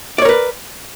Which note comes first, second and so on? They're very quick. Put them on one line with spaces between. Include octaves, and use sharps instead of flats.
D5 C#5 A#4 B4